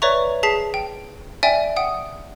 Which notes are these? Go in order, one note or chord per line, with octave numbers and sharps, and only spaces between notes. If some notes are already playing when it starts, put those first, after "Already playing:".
B4 C#5 D5 E5 A#5 C#6
G#4 A5 B6 C7
G5
D5 E5 G5 G#5
F#5 G5 D#6